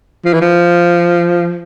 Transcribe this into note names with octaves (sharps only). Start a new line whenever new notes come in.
F3
E3
F3